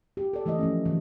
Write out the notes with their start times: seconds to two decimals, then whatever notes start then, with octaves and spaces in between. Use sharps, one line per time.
0.17 G4
0.33 A4 D5
0.46 E3 A3 E4 D5 D#5
0.59 F3 A3 C#4
0.86 E3 F#3